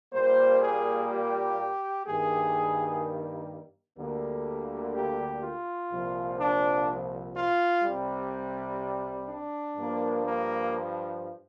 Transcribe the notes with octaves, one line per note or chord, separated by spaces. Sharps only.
A#2 G3 A#3 C5
G#4
G4
G2 D#3 G3 A#3 G#4
D2 D3 G3 A#3
G4
F4
C2 A#2 F3
D4
F4
C2 C3 G3
D4
G2 F3 A#3
A#3